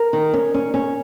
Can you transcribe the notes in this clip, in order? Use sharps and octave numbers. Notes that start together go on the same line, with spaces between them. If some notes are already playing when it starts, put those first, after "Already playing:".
Already playing: A#4
D#3
C#4
C#4
C#4